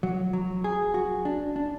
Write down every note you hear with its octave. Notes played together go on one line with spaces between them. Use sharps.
F#3
F#3
G#4
F#4
D4
D4